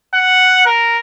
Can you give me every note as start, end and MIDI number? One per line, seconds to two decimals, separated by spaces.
0.14 0.64 78
0.66 0.98 70